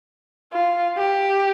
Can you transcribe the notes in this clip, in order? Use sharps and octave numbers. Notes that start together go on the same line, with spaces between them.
F4
G4